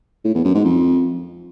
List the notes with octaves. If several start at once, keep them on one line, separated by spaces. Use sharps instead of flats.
A2
E2
F#2
G#2
F2